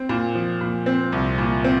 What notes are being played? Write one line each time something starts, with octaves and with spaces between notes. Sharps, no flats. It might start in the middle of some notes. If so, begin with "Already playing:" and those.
Already playing: C4
A#2
F3
A#2
C4
C2
A#2
C4